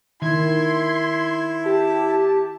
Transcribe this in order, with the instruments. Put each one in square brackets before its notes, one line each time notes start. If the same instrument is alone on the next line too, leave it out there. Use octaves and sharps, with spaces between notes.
[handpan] D#3 [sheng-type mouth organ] E4 [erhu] C6 [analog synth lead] G#6
[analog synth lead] G4 [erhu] A5